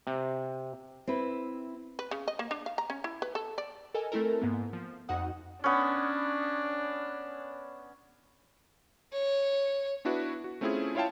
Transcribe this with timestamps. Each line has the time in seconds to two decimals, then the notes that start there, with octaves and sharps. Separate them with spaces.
0.07 C3
1.07 C4 E4 B4
1.99 B4
2.11 C#3
2.28 D#5
2.39 A#3
2.51 D4
2.66 F5
2.78 A#5
2.90 C#4
3.04 E4
3.22 B4
3.35 A4
3.58 D5
3.94 A4 A#4 D#5 G#5
4.12 A3 C4 E4 A4 A#4
4.42 G#2 A#3 B3
4.73 F3
5.09 F2 D#4 F#4 F#5 D#6
5.64 B3 C#4 D4
9.13 C#5
10.05 B3 D4 E4 F#4 B4
10.44 F#4
10.61 A3 C4 C#4 E4 F4 G#4
10.95 E4 F4 C#5 F5 G5 A5